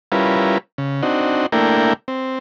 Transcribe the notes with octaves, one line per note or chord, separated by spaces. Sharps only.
G3 C#4 E4 F4 A#4 B4
C#3
C4 D4 D#4 F#4
A3 A#3 D4 E4 A#4 G5
C4